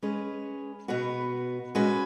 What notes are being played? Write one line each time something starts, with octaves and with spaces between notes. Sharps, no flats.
G#3 C#4 G#4 B4
B2 B3 F#4 B4
G#3 C#4 F#4 B4